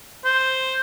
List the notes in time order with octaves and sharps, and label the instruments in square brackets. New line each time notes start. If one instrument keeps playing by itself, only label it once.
[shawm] C5